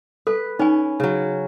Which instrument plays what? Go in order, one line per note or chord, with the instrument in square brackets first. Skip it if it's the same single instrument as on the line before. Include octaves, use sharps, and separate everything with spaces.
[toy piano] A4 [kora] B4
[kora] C#4 [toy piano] D#4 G#5
[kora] C#3 F#3